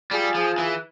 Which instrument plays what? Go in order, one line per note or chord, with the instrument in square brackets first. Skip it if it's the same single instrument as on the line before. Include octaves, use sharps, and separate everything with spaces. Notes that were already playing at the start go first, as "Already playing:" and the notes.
[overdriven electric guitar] G3 [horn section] F4 G#4
[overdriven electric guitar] F3
E3